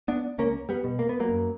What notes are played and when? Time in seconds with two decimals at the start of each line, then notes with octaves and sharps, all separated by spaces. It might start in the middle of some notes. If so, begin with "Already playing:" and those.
0.08 B3 D4
0.38 C#2 A#3 C#4
0.69 G3 B3
0.84 B2
0.99 A#3
1.09 B3
1.20 F#3 A#3
1.29 F#2